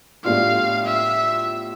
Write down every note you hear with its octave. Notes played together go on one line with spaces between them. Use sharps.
A2 G3 B3 D4 F4 F5
E5